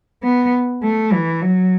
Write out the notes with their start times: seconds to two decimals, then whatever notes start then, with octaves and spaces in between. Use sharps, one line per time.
0.23 B3
0.82 A3
1.12 E3
1.41 F#3